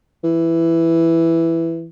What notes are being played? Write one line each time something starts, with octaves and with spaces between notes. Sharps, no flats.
E3